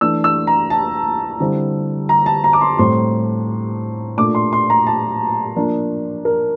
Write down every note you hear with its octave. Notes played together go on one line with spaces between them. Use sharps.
E3 A3 D4 E6
E6
A#5
A5
D3 G3 C4 E4
A#5
A5
A#5
D6
C6
A2 G3 C4 C6
A#2 A3 D4 D6
C6
C6
A#5
A5
F3 A#3 D4
A#4